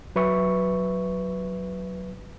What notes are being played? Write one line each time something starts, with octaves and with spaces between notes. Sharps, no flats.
F#3 B4 E5 C#6